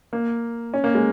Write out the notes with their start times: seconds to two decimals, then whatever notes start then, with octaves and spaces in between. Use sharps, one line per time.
0.13 A#3
0.74 C#4
0.84 A#3
0.95 G#3